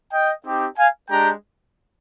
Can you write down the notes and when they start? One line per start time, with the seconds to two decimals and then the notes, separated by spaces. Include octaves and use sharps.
0.12 D#5 G5
0.44 C4 D#4 G4
0.77 F5 G#5
1.09 G#3 D4 G4 G5 A#5